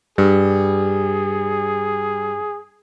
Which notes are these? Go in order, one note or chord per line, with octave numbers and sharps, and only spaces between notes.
G2 G3 G#4